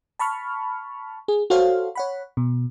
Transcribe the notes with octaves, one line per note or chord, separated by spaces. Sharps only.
A5 B5 C#6 F6
G#4
F#4 A4 C5 C#5 F5
C#5 F#5 B5
B2